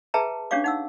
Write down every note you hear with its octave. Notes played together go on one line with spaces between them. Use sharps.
G#4 B4 E5 G5 A5 A#5
C#4 D4 G4 C#5 F5 D6
D#4 F#5 E6